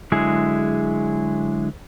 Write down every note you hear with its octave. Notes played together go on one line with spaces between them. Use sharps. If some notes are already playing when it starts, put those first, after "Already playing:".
D3 F#3 G#3 E4 G#4